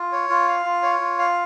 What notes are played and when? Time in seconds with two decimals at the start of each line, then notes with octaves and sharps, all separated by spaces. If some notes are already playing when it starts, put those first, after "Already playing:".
Already playing: F4
0.12 C#5
0.30 F4
0.48 F5
0.65 F4
0.82 C#5
1.00 F4
1.19 F5